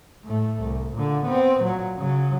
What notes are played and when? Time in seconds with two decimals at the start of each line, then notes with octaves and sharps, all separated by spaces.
0.24 A2 A3
0.62 C2
0.94 A#2 D3
1.26 B3 C4
1.61 A#2 F#3
1.97 C#3 F#3